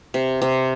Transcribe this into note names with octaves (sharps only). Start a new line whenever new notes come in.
C3
C3